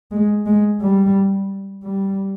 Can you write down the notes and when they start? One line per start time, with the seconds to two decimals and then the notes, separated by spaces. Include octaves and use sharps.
0.12 G#3
0.46 G#3
0.81 G3
1.84 G3